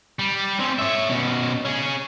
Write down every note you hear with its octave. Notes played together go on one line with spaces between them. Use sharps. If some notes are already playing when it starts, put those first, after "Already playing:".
G3
C4 C#4
C#5 E5
B2 C#4
C#4 G#4